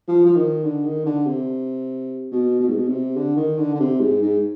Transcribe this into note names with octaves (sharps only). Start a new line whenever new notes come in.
F3
F3
D#3
D3
D#3
D3
C3
B2
B2
G#2
B2
C3
D3
D#3
D3
D3
C3
G#2
G#2